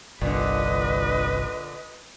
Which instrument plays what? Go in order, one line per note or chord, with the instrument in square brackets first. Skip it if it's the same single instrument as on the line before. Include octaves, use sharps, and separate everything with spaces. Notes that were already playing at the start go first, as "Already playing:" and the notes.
[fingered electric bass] G1 C2 [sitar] A#2 D3 [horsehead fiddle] B4 D#5